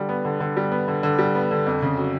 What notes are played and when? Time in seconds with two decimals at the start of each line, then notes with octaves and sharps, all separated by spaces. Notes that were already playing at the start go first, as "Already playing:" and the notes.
Already playing: D3 G3
0.09 B3
0.25 D3
0.40 D3
0.57 G3
0.72 B3
0.88 D3
1.03 D3
1.19 G3
1.35 B3
1.51 D3
1.66 F2
1.82 C#3
1.97 F#3